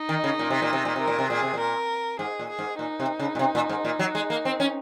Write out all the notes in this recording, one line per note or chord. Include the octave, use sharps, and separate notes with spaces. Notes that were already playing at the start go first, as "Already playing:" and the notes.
Already playing: D#4
D#3
C#3
A#2
C3
A#2
C3
A#2
C3 A#4
A#2
C3
A#2 G#4
C3
A#2
A#4
G#2 G#4
A#2
G#4
G#2
A#2 D#4
C3
C#3
A#2
C3
A#2
G#2
A#2
F#3
G#3
A#3
C4
C#4